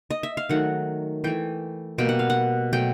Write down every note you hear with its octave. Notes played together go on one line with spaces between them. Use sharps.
D#5
E5
F5
D#3 F#3 A3 F#5
E3 A3 G5
B2 G3 A#3 G5
F#5
F5
F#5
B2 F#3 A3 G5